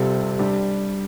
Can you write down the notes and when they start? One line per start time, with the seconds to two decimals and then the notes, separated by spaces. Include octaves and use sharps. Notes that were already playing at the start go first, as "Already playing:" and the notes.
Already playing: C3 G3 F4 A4
0.39 G3 D4 G4